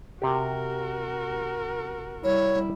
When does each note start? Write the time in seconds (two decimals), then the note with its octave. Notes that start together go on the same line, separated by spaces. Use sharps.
0.22 C3 F#4 G4 A#4
2.24 G3 E4 C#5